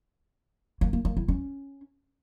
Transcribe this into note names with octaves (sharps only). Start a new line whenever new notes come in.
A#3
A#3
A#3
E4
C#4